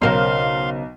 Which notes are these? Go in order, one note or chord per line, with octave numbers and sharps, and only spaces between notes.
B1 C#3 A#4 C5 F5 C6